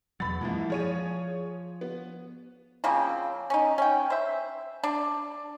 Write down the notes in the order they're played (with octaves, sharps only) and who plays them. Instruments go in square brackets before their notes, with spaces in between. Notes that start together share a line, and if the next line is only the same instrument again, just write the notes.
[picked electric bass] E2 B2 F#3 [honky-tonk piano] B5 A6
[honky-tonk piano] C2 E3 F3 [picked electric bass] F#2 G#3 A#3
[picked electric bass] F3 [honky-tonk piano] G#4 C#5 D#7
[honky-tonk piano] B3
[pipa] C#3 F3 A#3 C4
C#4 D#4
C#4 G5
C5 E5
D4